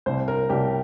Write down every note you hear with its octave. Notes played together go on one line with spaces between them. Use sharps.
C2 C5
A#4
C2 G4